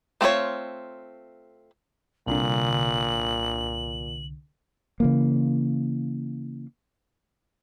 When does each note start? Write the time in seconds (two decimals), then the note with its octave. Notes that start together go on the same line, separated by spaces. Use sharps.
0.21 A3 C4 F4 G#4 C#5
2.27 C2 A#2 D3 F#7
5.00 C#3 E3 A#3